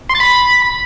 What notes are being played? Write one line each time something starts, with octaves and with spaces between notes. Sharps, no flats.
C6
A6
B5